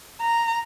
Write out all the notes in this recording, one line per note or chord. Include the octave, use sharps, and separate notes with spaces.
A#5